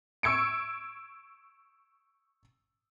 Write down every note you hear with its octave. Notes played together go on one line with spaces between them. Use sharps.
C#6 E6 G#6 C#7 D7